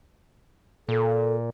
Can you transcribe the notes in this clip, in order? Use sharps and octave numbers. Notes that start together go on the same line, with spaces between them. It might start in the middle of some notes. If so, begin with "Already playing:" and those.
A#2 A4